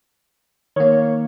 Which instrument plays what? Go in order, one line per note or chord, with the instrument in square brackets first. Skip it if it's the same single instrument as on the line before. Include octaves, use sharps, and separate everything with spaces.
[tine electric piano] D#3 A#3 [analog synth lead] C#5